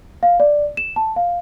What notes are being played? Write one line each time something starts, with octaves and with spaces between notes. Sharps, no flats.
F5
D5
E7
A5
F5